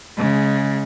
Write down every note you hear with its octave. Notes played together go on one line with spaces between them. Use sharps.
C#3 G#3